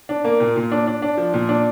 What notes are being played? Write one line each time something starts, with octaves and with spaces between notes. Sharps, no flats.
D4
A#3
A#2
A#2
D4
D4
D4
F3
A#2
D4